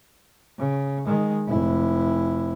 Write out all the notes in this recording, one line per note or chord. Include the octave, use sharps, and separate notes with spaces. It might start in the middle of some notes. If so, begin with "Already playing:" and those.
C#3
D#3 G#3
F1 E4